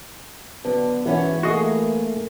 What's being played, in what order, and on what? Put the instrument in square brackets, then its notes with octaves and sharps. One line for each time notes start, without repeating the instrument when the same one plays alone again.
[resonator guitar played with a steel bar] D3 [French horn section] F#3 [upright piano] B3
[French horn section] E2 G#2 [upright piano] E3 [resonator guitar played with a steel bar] B3 C#4 F#4
[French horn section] A3 A#3 [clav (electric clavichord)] F#4 D#5 [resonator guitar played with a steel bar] G#4